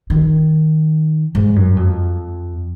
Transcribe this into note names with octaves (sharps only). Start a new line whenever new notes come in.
D#3
G#2
F#2
F2